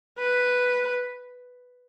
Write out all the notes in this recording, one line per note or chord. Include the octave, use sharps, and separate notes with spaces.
B4